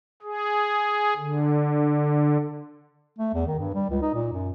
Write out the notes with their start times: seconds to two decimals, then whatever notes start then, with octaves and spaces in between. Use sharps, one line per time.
0.22 G#4
1.17 D3
3.19 A3
3.34 E2
3.47 D#3
3.59 G2
3.74 G3
3.90 C#2
4.02 D#4
4.13 A#2
4.32 F#2